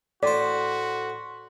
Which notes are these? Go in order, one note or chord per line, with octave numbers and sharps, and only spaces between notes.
A2 F#4 C5 D5 C6 D6 B6